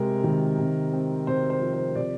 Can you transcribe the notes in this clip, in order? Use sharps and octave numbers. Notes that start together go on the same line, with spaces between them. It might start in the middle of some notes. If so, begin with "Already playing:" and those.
Already playing: C3 G#3 C4 A#4
D#3
C3
C4
C3 C5
C5
F3
C5
C3 D5